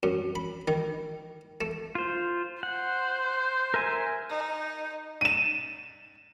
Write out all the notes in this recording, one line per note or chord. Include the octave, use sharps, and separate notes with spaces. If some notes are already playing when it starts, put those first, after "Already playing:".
F#2
B5
D#3
A3
F4 C5
C5 F#5
A#4 E5 G#5
D#4
D#7 E7